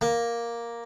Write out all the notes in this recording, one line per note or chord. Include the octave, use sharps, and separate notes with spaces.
A#3